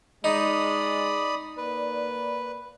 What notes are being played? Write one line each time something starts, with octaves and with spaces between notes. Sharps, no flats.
G#3 D#4 D5 B5 D#6
A#3 B4 D5